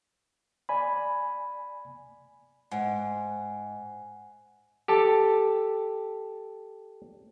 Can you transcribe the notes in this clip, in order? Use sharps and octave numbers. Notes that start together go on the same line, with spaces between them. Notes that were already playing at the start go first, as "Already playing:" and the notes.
D5 G#5 B5
G#2 F#5 G#5
G4 A4 A5